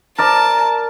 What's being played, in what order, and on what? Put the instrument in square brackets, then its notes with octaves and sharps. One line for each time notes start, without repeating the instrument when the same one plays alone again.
[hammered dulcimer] A#4 D5 [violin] A5